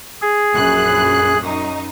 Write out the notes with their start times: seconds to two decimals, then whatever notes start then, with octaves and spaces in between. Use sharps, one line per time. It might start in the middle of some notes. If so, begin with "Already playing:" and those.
0.22 G#4
0.52 A#1 F#2 F#6
1.41 F#2 D#4